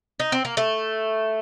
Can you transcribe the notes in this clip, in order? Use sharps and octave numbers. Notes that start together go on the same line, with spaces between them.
D#4
C4
A#3
A3